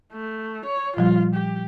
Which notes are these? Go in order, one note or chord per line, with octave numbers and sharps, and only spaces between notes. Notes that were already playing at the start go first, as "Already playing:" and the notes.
A3
C#5
A#2 F3 G3 F4
G4